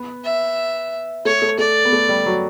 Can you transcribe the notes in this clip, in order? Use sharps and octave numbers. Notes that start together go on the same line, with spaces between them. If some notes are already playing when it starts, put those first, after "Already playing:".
Already playing: B3
E5
A3 C#5
A3
A3 D5
B3
A3
G3
F#3